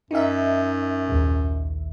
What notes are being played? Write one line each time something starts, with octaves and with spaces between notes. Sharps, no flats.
F#2 D#4 E5
A#1 D#2